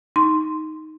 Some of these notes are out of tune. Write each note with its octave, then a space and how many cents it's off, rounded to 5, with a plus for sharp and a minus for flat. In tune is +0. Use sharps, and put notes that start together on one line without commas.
D#4 +5 C6 +0